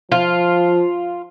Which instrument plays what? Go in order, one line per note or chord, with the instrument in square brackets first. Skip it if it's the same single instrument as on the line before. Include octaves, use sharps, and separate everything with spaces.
[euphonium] F3 [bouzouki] F4